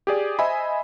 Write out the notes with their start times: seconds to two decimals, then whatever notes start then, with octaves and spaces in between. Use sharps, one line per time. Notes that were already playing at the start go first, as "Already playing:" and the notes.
0.07 G4 G#4 D5
0.39 C5 D#5 E5 G#5 B5